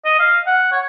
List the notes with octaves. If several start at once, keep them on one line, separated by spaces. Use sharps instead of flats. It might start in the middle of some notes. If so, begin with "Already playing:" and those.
D#5
F5
F#5
C#5